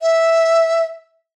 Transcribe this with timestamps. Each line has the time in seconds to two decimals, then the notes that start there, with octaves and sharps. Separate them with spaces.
0.01 E5